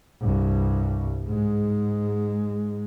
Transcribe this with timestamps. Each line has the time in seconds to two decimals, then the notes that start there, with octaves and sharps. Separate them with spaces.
0.21 C2 G2
1.25 G#2 G#3